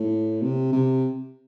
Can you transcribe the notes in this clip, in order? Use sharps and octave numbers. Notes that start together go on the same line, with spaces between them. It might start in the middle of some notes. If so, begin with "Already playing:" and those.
Already playing: A2
C3
C3